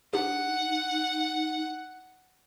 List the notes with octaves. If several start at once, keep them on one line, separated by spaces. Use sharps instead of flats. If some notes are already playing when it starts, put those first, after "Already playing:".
D4 D#4 G4 F#5